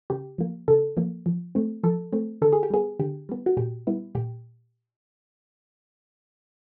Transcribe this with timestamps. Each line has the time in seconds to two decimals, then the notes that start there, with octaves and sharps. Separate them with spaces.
0.10 C#3 G4
0.38 F3 A#3
0.68 C#3 A4
0.97 F3 A#3
1.26 F3
1.55 A3 C4
1.84 F3 A4
2.13 A3 C4
2.42 D3 A4
2.53 G#4
2.63 G4
2.70 G3 B3 G#4
3.00 D3 G4
3.29 G3 B3
3.46 F#4
3.57 A#2 G4
3.87 G3 B3 E4
4.15 A#2 G4